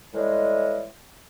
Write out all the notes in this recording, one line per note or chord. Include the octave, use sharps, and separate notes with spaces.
A2 E3 G3 G#3